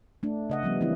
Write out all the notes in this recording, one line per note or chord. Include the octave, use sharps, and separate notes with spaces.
A3 D4
C#3 D#5 F#5
F3 G3 B3
E3 A#3 C4 E4